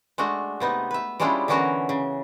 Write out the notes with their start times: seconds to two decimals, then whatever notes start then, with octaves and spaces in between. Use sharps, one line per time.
0.18 G#3 A3 D4 F#4
0.60 C3 B3 D#4
0.91 B4 E5
1.20 G3 G#3 C#4 D4 E4 F4
1.48 D3 E3 B3 C#4 F#4 A#4
1.89 C#3